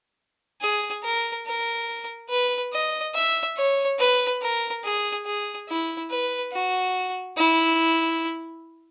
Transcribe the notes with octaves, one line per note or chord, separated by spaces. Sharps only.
G#4
A#4
A#4
B4
D#5
E5
C#5
B4
A#4
G#4
G#4
E4
B4
F#4
E4